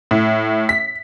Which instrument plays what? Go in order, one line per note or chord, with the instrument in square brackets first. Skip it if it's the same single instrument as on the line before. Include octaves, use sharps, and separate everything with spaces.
[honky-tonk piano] A2
B6